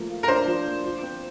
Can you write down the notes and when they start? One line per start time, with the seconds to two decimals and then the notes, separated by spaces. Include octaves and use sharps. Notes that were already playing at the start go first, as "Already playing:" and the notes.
Already playing: F3 A3 A#3
0.09 F4
0.23 A#4
0.28 D4 C5
0.47 F3
0.65 A#3
0.84 F3
1.03 C4